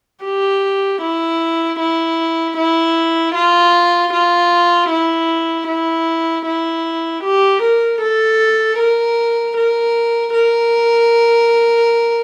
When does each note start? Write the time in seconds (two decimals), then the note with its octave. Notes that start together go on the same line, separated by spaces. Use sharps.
0.24 G4
1.02 E4
1.79 E4
2.57 E4
3.34 F4
4.13 F4
4.90 E4
5.68 E4
6.46 E4
7.23 G4
7.62 A#4
8.01 A4
8.79 A#4
9.57 A#4
10.34 A#4